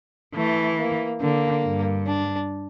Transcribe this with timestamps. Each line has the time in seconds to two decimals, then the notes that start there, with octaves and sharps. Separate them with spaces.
0.35 E3 A3
0.78 A#3
1.21 D3 A#3
1.64 G2
2.07 D4